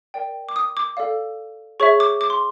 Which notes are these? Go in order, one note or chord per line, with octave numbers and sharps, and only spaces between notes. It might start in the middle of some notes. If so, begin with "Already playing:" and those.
A#4 D5 G5
D6
D#6
D6
A4 D5 F5
G#4 C#5 E5 C#6
D6
D6
C6